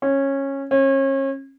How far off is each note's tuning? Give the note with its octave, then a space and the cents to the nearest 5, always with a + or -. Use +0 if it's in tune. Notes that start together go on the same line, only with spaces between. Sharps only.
C#4 -15
C#4 -35